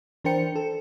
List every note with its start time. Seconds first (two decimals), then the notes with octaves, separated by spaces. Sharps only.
0.24 E3 D4 A#4 C5 G5 C#7
0.56 A4